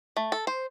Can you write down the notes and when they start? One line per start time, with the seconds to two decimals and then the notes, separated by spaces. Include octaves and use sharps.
0.17 A3
0.32 A4
0.47 C5